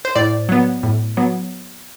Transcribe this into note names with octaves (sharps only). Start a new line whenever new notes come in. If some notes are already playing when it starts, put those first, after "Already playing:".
C5
A2 D5
F#3 B3
A2
F#3 B3